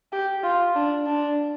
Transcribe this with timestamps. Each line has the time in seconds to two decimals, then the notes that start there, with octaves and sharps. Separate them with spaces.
0.12 G4
0.43 F4
0.75 D4
1.06 D4